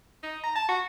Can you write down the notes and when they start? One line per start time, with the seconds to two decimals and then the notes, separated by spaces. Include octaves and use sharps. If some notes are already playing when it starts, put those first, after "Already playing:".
0.23 D#4
0.43 A#5
0.55 A5
0.68 F#4